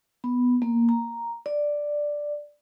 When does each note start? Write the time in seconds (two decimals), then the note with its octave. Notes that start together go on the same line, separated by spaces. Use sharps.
0.24 B3
0.62 A#3
0.89 A#5
1.46 D5